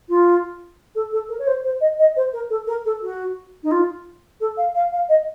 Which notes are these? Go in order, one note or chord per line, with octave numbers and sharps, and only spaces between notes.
F4
A4
A4
A#4
C#5
C5
C5
D#5
D#5
C5
A#4
A4
A#4
A4
F#4
D#4
F4
A4
F5
F5
F5
D#5